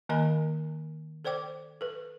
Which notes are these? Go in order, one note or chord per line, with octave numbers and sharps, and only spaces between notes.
D#3 A#3 A#4 D#5 G#5 B5
A4 C5 D5 G5 D6
A4 B4